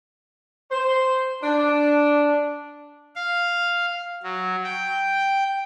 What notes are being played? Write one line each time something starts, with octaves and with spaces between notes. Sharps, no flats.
C5
D4
F5
F#3
G5